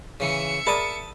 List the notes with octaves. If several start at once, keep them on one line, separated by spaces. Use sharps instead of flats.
C#3 E3 E5 C#7
G#4 A#4 D5 A5 B5 D#6